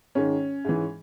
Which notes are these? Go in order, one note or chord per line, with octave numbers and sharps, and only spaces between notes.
G#2 D#3 C#4
G#2 E3